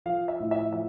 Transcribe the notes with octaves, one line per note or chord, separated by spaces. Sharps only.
F3 F5
E5
A2
E5
F3 E5